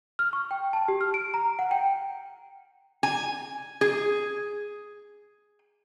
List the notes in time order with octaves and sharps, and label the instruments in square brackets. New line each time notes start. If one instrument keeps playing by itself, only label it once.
[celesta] F6
C#6
G5
A5
G4
F6
D7
A#5
F#5
G5
[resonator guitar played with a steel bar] G#5
G#4